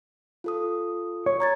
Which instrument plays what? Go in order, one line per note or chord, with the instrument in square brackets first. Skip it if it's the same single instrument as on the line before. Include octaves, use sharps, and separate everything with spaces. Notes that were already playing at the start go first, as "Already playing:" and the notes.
[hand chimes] F4 A4 D#6
[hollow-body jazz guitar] C#5
[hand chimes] A#5 G#6 A6